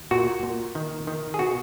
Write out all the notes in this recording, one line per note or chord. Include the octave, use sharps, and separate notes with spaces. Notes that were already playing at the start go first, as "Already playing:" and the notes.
Already playing: D#2
A#2 F#4
A#2
D#3
D#3
G#4
B2 F#4